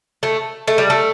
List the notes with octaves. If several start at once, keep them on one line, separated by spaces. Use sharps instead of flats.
A3
A3
G3
A3